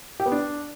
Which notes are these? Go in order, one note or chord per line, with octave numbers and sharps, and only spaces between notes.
G4
B3
D4